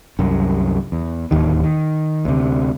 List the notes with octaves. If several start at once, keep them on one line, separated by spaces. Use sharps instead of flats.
C2 F#2
E2
D1 A1 D#2 D#3
D#3
D2 C3